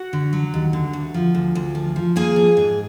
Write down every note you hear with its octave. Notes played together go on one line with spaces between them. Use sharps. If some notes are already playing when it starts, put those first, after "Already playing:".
Already playing: F#4 F#5
D3
F#3
D#2
D3
D2
F3
D2
D2
F3
F3
A#3 G#4 G#5
F3
G#2